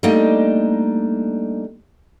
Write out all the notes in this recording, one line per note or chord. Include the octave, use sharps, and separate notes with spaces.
G3 A3 A#3 D4 D#4 D#5